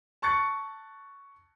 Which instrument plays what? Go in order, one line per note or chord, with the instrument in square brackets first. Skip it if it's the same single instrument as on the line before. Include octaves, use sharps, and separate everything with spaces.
[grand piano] A5 C#6 F#6 A6 C#7